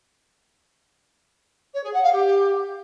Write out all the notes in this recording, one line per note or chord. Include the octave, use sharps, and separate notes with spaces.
C#5
G#4
F#5
F5
G4